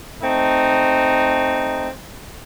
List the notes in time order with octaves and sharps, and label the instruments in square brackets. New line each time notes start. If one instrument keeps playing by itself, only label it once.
[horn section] A3 C4 D#4